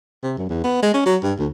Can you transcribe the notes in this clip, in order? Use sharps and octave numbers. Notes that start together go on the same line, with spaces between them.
C3
F#2
E2
B3
G#3
C#4
F#3
G2
D2